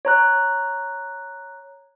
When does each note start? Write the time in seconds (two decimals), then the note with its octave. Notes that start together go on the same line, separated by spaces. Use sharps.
0.05 C#5 A#5 F#6